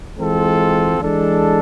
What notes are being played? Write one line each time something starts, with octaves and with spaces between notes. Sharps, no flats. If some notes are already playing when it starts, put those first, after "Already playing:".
E3 G#3 C4 F4 A4
E3 G#3 D4 A4